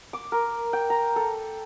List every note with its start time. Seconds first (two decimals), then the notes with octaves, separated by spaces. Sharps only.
0.13 D6
0.32 A#4
0.73 G5
0.90 A#5
1.16 A4